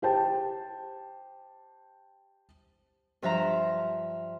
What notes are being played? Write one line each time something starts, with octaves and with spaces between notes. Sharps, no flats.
G4 C5 G5 A5
G2 F3 E5 F5 A#5